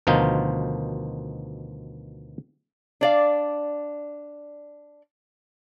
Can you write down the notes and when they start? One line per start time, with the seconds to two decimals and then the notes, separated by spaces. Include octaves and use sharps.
0.07 D2 B2 D#3 F3 D#4 F4
3.01 D4 D5 F5